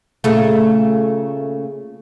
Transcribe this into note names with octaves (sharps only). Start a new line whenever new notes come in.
A#2 C#3 A3